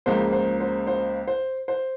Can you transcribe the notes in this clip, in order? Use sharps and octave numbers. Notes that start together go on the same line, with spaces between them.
C#2 C#3 F3 A#3 C5
C5
C5
C5
C5
C5